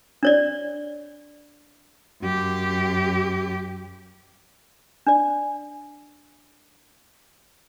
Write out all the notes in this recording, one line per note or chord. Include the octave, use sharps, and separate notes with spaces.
D4 C#5 D5
F#2 G4
D4 D5